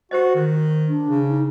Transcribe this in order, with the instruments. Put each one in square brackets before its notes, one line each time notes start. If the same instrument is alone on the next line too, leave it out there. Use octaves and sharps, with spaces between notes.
[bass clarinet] F#4 [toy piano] G4 C5 D#5
[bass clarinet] D#3
[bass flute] D4
[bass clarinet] C#3
[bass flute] D#4